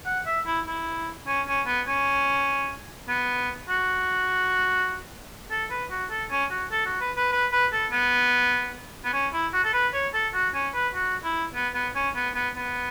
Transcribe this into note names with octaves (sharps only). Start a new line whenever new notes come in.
F#5
E5
E4
E4
C#4
C#4
B3
C#4
B3
F#4
A4
B4
F#4
A4
C#4
F#4
A4
F#4
B4
B4
B4
B4
A4
B3
B3
C#4
E4
F#4
A4
B4
C#5
A4
F#4
C#4
B4
F#4
E4
B3
B3
C#4
B3
B3
B3